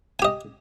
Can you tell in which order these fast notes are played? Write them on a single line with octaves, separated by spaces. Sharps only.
G#5 G4 D#5